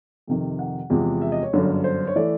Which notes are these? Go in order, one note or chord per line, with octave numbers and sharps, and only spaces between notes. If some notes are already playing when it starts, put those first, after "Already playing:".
F2 C3 D#3
F#5
E2 C3 F3 G#3
E5
D#5
C#5
G1 F#2 D3
C5
C#5
E3 A3 D5